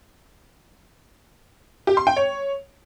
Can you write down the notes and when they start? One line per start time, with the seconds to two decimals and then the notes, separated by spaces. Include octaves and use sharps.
1.87 G4
1.97 C6
2.07 G5
2.17 C#5